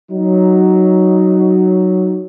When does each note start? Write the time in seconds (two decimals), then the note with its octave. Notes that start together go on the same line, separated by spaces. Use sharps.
0.11 F#3 D#4